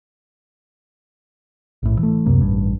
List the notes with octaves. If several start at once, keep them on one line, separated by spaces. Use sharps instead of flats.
A#1 A2
E3 A3
C#2 F#2 C3 A#3
A1 G2